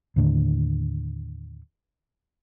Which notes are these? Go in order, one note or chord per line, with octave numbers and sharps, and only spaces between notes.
D#2 A2 D3